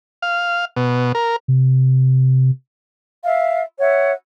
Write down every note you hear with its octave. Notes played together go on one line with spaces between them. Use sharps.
F5
B2
A#4
C3
E5 F5
C#5 E5 F#5